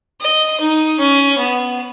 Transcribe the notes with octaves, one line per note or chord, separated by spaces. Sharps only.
D#5
D#4
C#4
B3